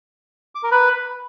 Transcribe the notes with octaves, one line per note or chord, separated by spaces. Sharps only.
D6
A#4
B4